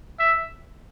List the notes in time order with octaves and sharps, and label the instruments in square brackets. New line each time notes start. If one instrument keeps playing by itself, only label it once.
[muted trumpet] E5